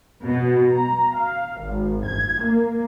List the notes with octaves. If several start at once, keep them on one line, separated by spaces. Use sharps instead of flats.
B2
A#5
F5
G#1
G#6
A#3